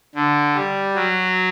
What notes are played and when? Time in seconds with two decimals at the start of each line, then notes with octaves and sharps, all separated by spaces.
0.15 D3
0.55 G3
0.94 F#3